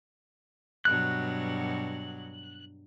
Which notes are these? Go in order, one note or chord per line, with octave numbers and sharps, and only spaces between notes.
G2 B2 F#3 F#6